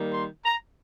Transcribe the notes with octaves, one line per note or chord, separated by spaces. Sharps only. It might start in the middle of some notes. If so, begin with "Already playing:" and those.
Already playing: D#3 G3 A#3
C6
A#5